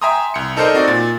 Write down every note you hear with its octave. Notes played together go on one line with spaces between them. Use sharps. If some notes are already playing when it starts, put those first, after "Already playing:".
E5 G5 G#5 A#5 C6 D#6
C2 C#7
D#4 A4 A#4 C5 D5 D#5
C4 D#4 F#4 D5
A#2 A6